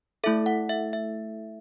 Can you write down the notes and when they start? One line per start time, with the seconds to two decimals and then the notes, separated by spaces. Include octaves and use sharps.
0.24 A3 E4 A4 E5
0.46 F#5
0.69 E5
0.93 E5